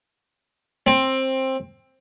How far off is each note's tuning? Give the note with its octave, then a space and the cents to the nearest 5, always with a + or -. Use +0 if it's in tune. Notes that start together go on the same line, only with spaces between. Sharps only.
C4 +15